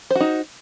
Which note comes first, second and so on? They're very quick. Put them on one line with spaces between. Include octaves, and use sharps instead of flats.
C5 F#4 D#4